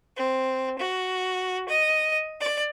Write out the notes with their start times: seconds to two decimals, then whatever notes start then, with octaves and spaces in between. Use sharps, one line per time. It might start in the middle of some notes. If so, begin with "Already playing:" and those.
0.17 C4
0.79 F#4
1.69 D#5
2.40 D5